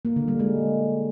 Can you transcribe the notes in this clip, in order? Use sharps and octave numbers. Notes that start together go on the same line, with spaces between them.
A#3
D3
G3
G#3